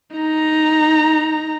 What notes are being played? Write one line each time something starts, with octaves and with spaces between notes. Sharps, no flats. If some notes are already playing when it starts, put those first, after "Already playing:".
D#4 A#5